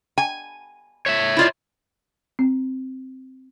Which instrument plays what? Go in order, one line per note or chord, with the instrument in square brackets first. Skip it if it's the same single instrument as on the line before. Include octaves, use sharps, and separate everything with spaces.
[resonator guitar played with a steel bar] G#5
[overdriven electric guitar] C#5 E5
[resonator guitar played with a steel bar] E4 F4 D5
[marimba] C4